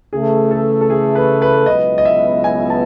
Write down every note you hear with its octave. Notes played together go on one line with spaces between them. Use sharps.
C#3 E3 A3 G#4
A4
A4
G#4
B4
B4
C#2 B2 F#3 B3 E4 D#5
D#5
E5
G#5
A5